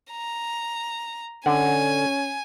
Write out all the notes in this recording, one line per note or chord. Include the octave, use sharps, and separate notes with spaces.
A#5
D3 C#4 F#5 G#5